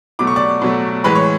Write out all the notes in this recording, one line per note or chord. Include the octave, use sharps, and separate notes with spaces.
B2 F#3 A3 D6
C#6
D5 D6
B2 F#3 A3
A2 E3 G#3 B4 B5
C#5 C#6